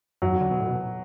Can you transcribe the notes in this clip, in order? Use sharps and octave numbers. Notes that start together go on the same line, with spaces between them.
F#2 F#3
F2
D3
B2
A2
B2